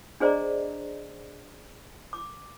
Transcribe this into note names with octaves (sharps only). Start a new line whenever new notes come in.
D4 G#4 C5 D5 D#5 A#5
D6